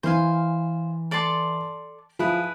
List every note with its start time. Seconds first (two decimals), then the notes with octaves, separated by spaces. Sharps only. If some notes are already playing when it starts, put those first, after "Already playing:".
0.03 E3 C5 F5 G#5
1.11 A4 D5 A5 C6
2.19 F3 E4 G#4 B4